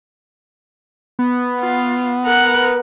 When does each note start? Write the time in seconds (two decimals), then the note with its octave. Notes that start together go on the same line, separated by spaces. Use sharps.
1.19 B3
1.60 F4
2.25 A#4 F#5